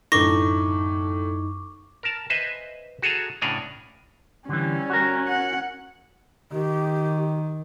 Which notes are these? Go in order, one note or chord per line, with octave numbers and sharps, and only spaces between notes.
F#2 A2 D3 A3 D#4 C#6 D6 A#6
A#4 A5
B4 C5 D#5 E5 G#5
F#4 G#4 A4 G#5 A#5
A2 C#3 D4 F#5 G#5 A#5
D3 E3 G3 C#4
F#4 A#4
F#5
D#3 G4